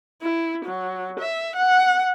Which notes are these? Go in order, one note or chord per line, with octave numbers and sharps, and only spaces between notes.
E4
F#3
E5
F#5